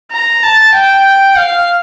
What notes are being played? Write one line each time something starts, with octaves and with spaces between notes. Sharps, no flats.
A#5
A5
G5
F5